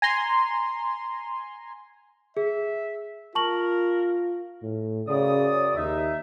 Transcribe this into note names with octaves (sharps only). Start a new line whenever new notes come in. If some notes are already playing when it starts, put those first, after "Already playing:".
G#5 A#5 C6
G#4 E5
F4 A#4 A5 C#6 F#7
A2
F#2 C#3 D5 D#6
D#2 D#4 E5